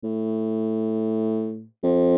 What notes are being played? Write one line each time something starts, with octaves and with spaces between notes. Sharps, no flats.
A2
F2